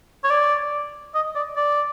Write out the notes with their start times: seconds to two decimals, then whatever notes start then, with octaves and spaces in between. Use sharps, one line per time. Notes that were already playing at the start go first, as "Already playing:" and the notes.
0.24 C#5
0.30 D5
1.14 D#5
1.35 D5
1.56 D5